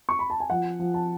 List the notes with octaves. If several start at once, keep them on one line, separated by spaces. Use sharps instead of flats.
C#6
B5
A5
G#5
F3 F#5
F3
A5